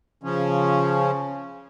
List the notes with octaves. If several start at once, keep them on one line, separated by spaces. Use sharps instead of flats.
C#3 F3 C#4